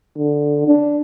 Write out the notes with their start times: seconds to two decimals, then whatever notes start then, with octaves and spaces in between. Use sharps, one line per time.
0.17 D3
0.68 D4